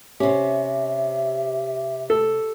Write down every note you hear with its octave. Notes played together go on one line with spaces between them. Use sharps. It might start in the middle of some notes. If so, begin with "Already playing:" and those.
C3 C#4 G4 E5
A4